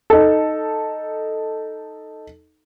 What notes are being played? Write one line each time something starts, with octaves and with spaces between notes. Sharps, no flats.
D#4 A4